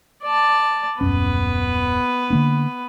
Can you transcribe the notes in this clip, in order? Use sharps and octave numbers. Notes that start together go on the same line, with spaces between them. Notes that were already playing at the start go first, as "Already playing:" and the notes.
D5 A5
D#1 F#2 B3 C#4 B4
D3 A#3 D4